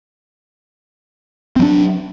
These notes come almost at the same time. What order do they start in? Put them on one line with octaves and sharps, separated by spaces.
C4 F#3 D4